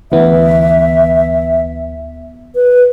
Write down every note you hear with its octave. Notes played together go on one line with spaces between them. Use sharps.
D2 E3 B3 E5
B4